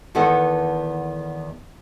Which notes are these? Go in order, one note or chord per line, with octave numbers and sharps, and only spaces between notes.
E2 D#3 B3 A4 E5 F#5